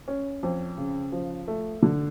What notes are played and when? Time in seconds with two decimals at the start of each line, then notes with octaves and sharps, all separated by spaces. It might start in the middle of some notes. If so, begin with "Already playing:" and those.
0.08 C#4
0.43 F2
0.78 C#3
1.12 F3
1.48 A3
1.83 D3